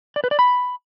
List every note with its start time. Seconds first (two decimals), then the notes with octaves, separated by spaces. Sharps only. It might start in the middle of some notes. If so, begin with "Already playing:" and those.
0.16 D5
0.24 B4
0.31 D5
0.39 B5